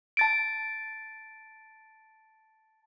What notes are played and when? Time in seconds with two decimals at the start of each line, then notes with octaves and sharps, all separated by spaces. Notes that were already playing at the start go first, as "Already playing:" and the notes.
0.17 A5 A6 D7